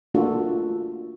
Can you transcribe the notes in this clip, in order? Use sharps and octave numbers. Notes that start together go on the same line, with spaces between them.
A3 A#3 D4 F4 F#4 A4